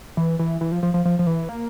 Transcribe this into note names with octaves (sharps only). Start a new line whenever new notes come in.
E3
E3
E3
F3
F3
F3
F3
F3
E3
A#3